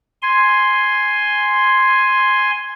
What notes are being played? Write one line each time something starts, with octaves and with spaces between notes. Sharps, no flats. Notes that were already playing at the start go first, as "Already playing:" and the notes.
G#5 C6